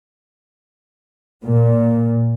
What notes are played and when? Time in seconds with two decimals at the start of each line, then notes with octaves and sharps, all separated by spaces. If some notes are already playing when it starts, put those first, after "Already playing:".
1.44 A#2